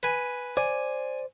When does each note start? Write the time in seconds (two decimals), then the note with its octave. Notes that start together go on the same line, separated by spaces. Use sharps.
0.03 B4 G#5
0.57 C5 D5 G#5